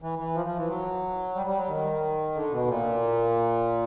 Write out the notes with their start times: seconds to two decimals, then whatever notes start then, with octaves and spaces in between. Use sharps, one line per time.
0.02 E3
0.19 E3
0.35 F3
0.46 F3
0.57 E3
0.68 F#3
1.35 G3
1.46 G3
1.58 F#3
1.68 D#3
2.35 D3
2.52 B2
2.68 A#2